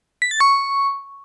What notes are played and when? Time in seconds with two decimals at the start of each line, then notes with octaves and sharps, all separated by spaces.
0.22 B6
0.31 A6
0.41 C#6